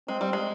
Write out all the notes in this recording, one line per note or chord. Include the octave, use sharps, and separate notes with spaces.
G#3 C4
G3
G#3